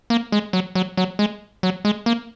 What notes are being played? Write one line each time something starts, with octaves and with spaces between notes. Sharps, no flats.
A#3
G#3
F#3
F#3
F#3
G#3
F#3
G#3
A#3